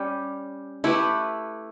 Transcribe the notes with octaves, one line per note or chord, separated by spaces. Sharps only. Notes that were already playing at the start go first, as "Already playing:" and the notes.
Already playing: G3 C#4 G4
A3 E4 G4 B4